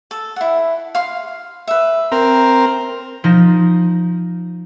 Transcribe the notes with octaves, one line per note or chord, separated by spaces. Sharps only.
A4
E4 F#5
F5 C6
B4 E5
C4 A#4
F3 D#4 A#6